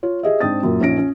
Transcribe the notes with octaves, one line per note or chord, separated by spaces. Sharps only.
F4 C#5
G4 G#4 D#5 E5
G#2 C4 D4 G5 D#6 A6
F#2 A#2
A#1 C#4 D#4 A#6 D7
C#4